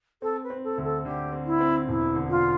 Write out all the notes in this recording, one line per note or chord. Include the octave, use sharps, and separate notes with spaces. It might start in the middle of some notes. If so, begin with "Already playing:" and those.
C4 A4
B4
C4
A4
D2
A4
D3 G4
C4
E4
C4
E1 E4
D3
F4